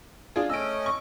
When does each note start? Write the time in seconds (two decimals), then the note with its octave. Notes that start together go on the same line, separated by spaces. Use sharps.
0.36 D4 F4 G#4
0.49 A3 C#4 D#5 E6 D7
0.86 C#6